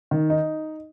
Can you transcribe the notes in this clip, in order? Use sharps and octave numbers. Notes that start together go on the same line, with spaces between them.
D#3
D#4